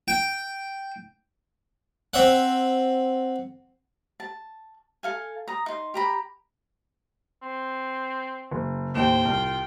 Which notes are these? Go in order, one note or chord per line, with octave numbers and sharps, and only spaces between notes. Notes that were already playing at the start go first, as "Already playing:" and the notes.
G5
C4 E5 F#5
A5
A4 F5 G#5
A#5 D#6
D#4 C6
G4 A#5 B5
C4
F#1
D#2 A2 C5 G5 E7
C2 F4